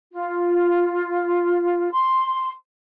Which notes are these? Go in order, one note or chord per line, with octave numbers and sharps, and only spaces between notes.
F4
C6